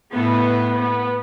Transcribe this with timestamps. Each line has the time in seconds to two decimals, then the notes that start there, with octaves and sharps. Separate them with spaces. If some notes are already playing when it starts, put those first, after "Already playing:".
0.13 A2 B3
0.77 B3